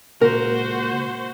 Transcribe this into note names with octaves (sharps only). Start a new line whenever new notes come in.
C#2 A#2 F#4 A#4 C5